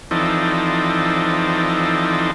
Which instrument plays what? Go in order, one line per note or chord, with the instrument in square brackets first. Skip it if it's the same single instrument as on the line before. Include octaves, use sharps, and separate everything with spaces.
[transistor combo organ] E3 F3 C4 D#4 A4 D5